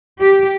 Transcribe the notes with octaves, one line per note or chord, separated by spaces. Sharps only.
G4